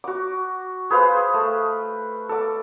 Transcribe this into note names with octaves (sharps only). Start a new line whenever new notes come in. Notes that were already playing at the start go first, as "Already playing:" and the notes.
F#4 D6
G#4 B4 C5 F5
A3
A4 D6